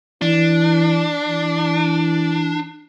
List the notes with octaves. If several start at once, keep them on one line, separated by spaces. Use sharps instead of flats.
E3 D4
E3